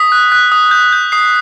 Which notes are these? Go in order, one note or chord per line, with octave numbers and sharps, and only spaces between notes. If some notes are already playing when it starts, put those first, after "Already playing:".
Already playing: D#6 B6
F#6
F#6
D#6
G6
G6
D#6 C7